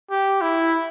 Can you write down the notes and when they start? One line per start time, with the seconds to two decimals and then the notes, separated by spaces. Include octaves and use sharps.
0.11 G4
0.41 E4